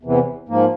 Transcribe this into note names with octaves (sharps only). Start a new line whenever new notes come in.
E2 C3 E3
G#2 F3 A#3